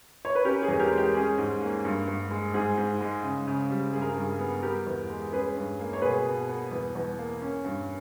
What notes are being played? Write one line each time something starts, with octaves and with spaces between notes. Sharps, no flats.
C#5
B4
C#4 G4 A#4
G#4
E2
G4 A#4
G#3
G4
C#4 G#4
G#2
A#3
G2
G2
G#3
G#2 G#4
G#2
G#3
C#3
C#3
G3
G2 G#4
A#4
G#4
G2
G#4
B3
B3 G4 A#4
E2
G#3
C#4 G#4 B4
G2
A#3
C#5
B2 G#4 B4
B2
B3
E2
E2
A#3
C#4
G2